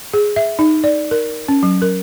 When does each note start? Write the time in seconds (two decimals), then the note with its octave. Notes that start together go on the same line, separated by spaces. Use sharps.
0.13 G#4
0.36 E5
0.59 D#4
0.84 D5
1.11 A#4
1.48 C#4
1.63 F#3
1.82 A#4